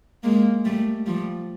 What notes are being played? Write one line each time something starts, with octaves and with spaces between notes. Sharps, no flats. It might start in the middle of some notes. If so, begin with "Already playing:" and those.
G#3 A#3
G3 A3
F3 G3